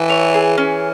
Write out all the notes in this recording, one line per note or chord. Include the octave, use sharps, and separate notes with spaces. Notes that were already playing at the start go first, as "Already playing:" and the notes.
Already playing: E3 E5
C#5
G#4
E3 C#4